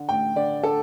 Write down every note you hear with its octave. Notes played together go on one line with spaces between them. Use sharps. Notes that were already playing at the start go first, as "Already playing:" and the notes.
Already playing: D3
A1 G5
D3 D5
D3 A4